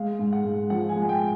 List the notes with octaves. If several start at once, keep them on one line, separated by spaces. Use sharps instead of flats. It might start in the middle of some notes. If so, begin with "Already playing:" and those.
Already playing: G#3 F5
G#2
F#5
G#2
F3 F#5
G#5
G#3
G#5
G5